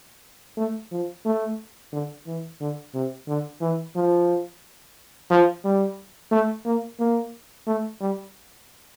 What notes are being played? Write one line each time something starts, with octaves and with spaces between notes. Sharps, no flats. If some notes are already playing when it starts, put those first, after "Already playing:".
A3
F3
A3
D3
E3
D3
C3
D3
E3
F3
F3
G3
A3
A#3
A#3
A3
G3